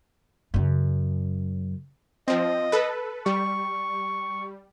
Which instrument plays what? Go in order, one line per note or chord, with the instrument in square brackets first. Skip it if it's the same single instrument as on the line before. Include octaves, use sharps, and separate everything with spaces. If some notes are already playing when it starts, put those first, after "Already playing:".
[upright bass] F#2 C#3
[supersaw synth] F3 C4 [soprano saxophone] D#5
[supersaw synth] A4 B4
[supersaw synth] G3 [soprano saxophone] C#6